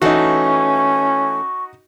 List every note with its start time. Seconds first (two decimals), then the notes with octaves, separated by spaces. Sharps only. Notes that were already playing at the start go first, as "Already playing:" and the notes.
0.02 E3 A3 C#4 D#4 F#4 C#6